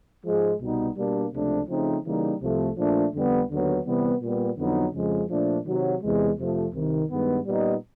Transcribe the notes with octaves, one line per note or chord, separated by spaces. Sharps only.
G#2 F3 G#3
C2 B2 G3 B3 D#4
B2 G3 A#3 D4
C#2 C3 F3 A3 D4
C#3 F3 A3 C4 D#4
C#3 E3 G3 A#3 D#4
C2 C3 F3 A3
A#2 F3 A3 D4
F2 D3 G3 B3
D#2 D3 F#3 B3
C3 E3 G3 B3
A#2 G3 B3
F2 D3 F#3 B3 D#4
F2 C#3 F3 G#3
A#2 F3 A3 D4
C3 D#3 F#3
E2 C3 E3 G#3
F2 C3 F3 A3
C2 C3 D#3
G2 D#3 G#3 B3
A#2 G3 B3 D#4